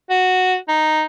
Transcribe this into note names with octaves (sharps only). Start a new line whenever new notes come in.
F#4
D#4